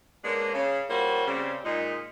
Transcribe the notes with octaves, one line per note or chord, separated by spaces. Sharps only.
G#3 A#3 B3 C#4 D4
C#3
G3 A#3 C#4 F4 F#4 C5
C#3 G3 C4
A#2 G#3 D#4